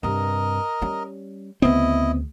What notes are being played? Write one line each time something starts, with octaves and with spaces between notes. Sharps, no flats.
G2 C3 A#4 D#5
G3 C#4
D2 C#3 B3 C4 E4 D#5